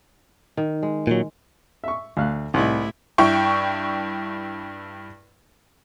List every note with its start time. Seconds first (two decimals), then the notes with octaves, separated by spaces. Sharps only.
0.57 D#3
0.82 G#3
1.07 A#2 F#3
1.84 E5 C#6
2.17 D2 F5 F#6
2.54 C2 A2 C3 D#4 E4
3.18 G2 E4 G5 C#6